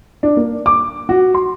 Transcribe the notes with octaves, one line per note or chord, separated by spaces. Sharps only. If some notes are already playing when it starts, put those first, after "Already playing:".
D4
A#3
D6
F#4
C6